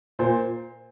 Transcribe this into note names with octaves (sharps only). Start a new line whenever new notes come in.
A#2 C5